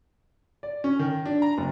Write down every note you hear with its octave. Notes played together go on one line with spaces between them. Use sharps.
D5
C#4
D#3
D4
A#5
F#1